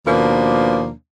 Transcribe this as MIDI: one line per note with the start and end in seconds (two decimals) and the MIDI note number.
0.07 0.91 39
0.07 0.91 47
0.07 0.91 53
0.07 0.91 58
0.07 0.91 62